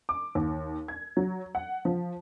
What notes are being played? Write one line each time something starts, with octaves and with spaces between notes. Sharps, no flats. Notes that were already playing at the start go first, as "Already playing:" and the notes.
D6
D#2
G#6
F#3
F#5
F3